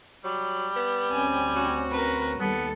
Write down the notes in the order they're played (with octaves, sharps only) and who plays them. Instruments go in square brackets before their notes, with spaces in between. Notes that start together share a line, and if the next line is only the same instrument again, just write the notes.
[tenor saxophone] F#3 [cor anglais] G3
[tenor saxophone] B3
[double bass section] D2 C4 C#4 [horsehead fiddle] G#5
[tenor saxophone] F#4
[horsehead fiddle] A#4 B4
[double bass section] D#2 G3 [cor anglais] B3 [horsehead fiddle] A4